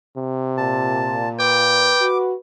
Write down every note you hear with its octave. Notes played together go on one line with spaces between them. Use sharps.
C3
A#2 A5
B4 G5 D6
F#4